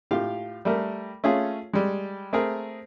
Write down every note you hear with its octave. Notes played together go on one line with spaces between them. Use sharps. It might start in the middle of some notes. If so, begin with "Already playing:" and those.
A2 F4 G4 F5
G3 A3 A#4
A3 C#4 F4 G#4
G3 G#3
A3 C4 G#4 A#4